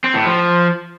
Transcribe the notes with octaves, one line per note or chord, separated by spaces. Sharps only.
C4
A2
F3